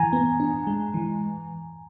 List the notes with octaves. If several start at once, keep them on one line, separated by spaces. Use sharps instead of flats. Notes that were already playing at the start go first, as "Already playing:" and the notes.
Already playing: E3 G#5 A#5
B3
D4
G#3
E3